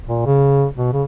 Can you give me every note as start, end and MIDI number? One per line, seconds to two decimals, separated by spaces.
0.08 0.21 46
0.26 0.66 49
0.76 0.93 47
0.93 1.03 49